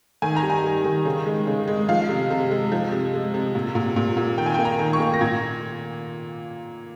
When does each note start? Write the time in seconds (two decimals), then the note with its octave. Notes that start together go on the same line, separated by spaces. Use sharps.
0.22 D#3 G#5
0.36 A#5
0.43 G3
0.50 G#5
0.64 G3
0.84 D#3
1.05 C#3
1.26 G#3
1.47 C#3
1.68 G#3
1.89 F3 F5
2.09 C3
2.30 C3
2.51 G#3
2.72 F3
2.92 C3
3.14 G#3
3.34 C3
3.55 A#2
3.75 A#2
3.96 A#2
4.17 A#2
4.38 D#3 G5
4.46 G#5
4.54 A#3 G5
4.65 A#5
4.79 D#3
4.93 C#6
5.00 A#3
5.14 A#6
5.21 A#2 G#6